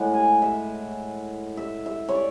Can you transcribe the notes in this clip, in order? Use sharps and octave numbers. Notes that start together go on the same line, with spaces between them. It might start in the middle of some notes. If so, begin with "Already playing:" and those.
Already playing: A2 G#3 F#5
G#5
E5
E5
E5
C#5
D5